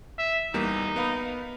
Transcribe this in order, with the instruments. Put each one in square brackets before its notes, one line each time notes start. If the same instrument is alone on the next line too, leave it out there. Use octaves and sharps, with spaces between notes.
[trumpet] E5
[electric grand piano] E2 G3 A#3 [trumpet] D#4
[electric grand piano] B3 F5 B5